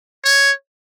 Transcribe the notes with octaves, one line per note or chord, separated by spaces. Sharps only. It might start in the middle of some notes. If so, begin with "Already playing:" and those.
C#5